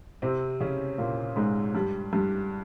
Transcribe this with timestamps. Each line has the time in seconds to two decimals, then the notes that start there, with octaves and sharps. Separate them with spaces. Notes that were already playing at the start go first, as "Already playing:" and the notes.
0.22 C3 C4
0.60 C#3 C#4
0.98 A#2 A#3
1.36 G#2 G#3
1.75 G2 G3
2.13 G2 G3